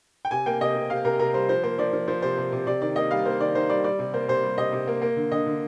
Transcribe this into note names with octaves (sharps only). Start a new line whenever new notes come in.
G5
C3 G#5
A#3 G5
C3 D#5
C3
C3 F5
C3 A#4
C3 A#4
G3 C5
F3 C5
A#3 C5
F3 D5
F3
F3 C5
C3 C5
C3
C3
C3 D5
D#3 D5
A#3 D#5
G3 F5
A#3 C5
D#3 D5
D#3 C5
G3 D5
G3 D5
C3
A#3 C5
C3 C5
G3
C3 D#5
C3
A#3
A#3
D3
D3 D#5
D3